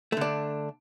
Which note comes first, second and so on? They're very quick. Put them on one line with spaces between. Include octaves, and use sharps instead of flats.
A3 D3 D4